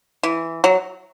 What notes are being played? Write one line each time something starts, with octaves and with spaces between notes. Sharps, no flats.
E3
F#3